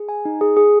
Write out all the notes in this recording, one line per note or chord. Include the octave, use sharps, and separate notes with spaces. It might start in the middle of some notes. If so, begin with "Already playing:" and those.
Already playing: G#4
G#5
D#4
G#4
G#4